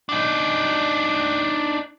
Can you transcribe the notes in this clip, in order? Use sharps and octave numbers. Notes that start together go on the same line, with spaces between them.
D4 D#4